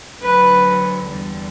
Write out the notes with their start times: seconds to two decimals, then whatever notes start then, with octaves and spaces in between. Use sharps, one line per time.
0.21 D2 D3 F#3 B4
1.07 E2 D3 G3